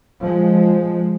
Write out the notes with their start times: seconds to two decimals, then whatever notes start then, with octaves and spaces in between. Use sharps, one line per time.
0.23 F3 G#3